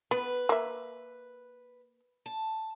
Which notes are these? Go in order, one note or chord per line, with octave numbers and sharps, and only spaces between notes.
B3 B4
A#3 E5
A5